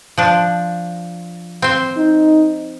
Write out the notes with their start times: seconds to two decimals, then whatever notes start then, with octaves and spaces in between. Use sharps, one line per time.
0.18 F3 D4
1.62 C4 C5
1.97 D#4